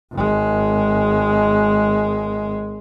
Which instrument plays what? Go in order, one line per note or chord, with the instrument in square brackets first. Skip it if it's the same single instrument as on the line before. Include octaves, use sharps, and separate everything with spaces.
[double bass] G#1 G#3